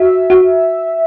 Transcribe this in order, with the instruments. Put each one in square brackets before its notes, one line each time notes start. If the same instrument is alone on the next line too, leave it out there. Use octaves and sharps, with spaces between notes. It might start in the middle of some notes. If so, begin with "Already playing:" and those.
Already playing: [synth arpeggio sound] F#4 [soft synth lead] E5
[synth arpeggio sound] F#4